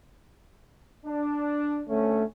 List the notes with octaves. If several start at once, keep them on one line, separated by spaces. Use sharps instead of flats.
D4
D2 A3 C#4